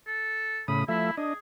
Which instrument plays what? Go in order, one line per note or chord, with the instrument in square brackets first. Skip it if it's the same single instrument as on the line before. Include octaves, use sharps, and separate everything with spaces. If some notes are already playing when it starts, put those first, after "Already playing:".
[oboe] A4
[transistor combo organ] A2 C#3 D#6 [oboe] B5
[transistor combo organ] F3 A3 E5 [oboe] E4
[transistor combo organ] D4 D#5 [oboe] G#4